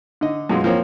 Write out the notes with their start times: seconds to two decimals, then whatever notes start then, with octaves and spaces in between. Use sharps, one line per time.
0.21 D3 D#5
0.50 F#2 B2 F#3 G#3 F4 F#4
0.64 F3 A#3 C4 C#5